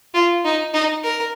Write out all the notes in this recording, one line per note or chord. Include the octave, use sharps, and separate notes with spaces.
F4
D#4
D#4
A#4